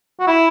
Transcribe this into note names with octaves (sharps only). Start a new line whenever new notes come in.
F#4
E4